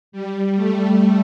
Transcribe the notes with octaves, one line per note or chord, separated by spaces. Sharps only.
G3
A3